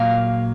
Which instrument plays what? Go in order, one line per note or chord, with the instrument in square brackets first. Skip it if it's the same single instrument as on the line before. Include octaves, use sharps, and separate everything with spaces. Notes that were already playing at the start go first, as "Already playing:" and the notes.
Already playing: [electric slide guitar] A#2 F#3 A#3 F5